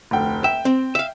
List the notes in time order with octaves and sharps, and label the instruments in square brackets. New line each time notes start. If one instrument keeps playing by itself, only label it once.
[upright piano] F1 D2 G5
[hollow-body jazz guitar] E5 [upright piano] G5
[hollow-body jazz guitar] C4
E5 F5